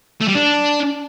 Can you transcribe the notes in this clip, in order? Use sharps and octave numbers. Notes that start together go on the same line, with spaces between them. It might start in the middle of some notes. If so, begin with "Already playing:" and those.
A3
G3
D4